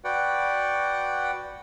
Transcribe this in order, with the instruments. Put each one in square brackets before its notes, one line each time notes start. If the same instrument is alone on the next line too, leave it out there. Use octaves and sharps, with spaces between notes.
[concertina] F#4 B4 D5 F#5 G5